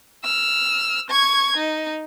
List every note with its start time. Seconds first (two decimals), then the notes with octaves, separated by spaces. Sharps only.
0.24 E6 F6
1.10 C#6 G#6
1.57 D#4